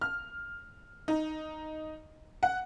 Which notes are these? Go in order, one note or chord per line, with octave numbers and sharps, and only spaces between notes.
F6
D#4
F#5